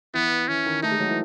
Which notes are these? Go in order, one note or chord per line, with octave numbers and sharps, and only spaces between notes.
E3 B3
E3 C#4
D#3
A3 D#4
G#3
F#3
E3